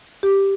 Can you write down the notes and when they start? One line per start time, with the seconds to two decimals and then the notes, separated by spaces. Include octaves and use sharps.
0.23 G4